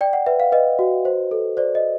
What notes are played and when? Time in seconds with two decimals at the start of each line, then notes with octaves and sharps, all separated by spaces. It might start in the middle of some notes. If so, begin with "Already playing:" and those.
0.01 D5 G5
0.13 F#5
0.26 B4 E5
0.40 F5
0.52 B4 D#5
0.79 F#4
1.05 C5
1.31 A4
1.57 C5 D5
1.75 D#5